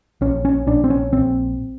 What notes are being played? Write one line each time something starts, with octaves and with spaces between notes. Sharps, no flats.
A#1 C#4
C#4
A#1 D4
C4
C#4
A#1 C4